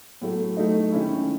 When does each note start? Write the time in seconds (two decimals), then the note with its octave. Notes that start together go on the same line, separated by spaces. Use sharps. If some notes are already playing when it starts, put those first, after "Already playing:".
0.21 A2 F#3 A3
0.57 F#3 A3 D#4
0.92 D#3 G#3 C#4 E4